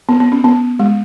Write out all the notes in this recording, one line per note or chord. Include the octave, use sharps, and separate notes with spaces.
B3
B3
C#4
B3
G#3